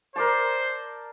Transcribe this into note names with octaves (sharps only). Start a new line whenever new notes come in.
A#4 C5 D5 A5